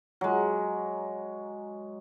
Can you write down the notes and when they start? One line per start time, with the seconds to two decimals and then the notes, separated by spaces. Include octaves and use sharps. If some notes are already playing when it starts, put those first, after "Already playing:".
0.21 F#3 G#3